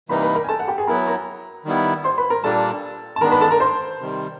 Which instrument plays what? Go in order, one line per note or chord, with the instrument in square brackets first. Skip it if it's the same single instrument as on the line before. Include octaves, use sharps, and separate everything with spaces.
[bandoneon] C3 E3 G3 A#3 D#4 [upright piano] B4 B5
[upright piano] B4 B5
A#4 A#5
G#5
A4 A5
F#5
G4 G5
G#4 G#5
[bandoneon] F#3 B3 E4 [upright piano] A#4 A#5
[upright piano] A#4 A#5
[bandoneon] D#3 G3 B3 E4
[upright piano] C5 C6
B4 B5
A#4 A#5
[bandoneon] A#2 G3 A#3 D4 [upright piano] A4 A5
[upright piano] A5
[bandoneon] D#3 G#3 B3 D4 [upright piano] A#4 A#5
[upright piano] B4 B5
A4 A5
A#4 A#5
C5 C6
[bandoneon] C3 D#3 G3